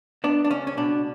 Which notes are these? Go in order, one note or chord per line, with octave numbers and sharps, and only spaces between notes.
B3 D4
D4
C#2 C#4
C#4
B2 D4